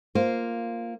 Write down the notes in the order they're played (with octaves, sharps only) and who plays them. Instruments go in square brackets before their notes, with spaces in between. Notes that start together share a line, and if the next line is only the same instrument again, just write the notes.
[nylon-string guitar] A#3 F4 C5